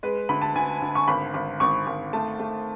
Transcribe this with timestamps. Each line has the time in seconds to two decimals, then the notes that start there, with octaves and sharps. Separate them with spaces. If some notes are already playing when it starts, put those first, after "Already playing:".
0.03 G#3 B4
0.29 D2 B5
0.42 A5
0.55 D2 G#5
0.82 D2
0.95 C#6
1.08 G#1 B5
1.34 G#1
1.60 G#1 C#6
1.87 G#1
2.13 A3 A5
2.40 A3